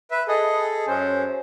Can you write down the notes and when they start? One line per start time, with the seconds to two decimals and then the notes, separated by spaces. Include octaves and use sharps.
0.11 B4 E5
0.28 G#4 A4 D#5
0.88 F#2 C#4 C5